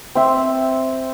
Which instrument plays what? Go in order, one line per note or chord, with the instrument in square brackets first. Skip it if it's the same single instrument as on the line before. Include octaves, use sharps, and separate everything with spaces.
[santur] C4 E5